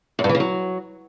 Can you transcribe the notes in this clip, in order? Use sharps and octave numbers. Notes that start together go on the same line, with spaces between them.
F#2
G2
E3
C#3
F#3